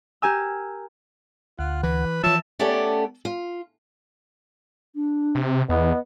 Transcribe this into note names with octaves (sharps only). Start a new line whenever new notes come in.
G4 A#4 G#5 E6
D2 F4 F#5
E3 B4
E3 F3 F4 C#5 E5 A5
A3 B3 C#4 G4 A4 D5
F4
D4
C3
E2 B3 D#5